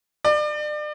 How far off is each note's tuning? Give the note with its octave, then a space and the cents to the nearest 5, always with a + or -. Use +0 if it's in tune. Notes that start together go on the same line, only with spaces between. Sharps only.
D5 +35